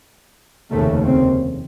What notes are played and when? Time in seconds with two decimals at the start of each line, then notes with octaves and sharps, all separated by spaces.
0.72 F1 D#2 C#3 A3
1.06 C4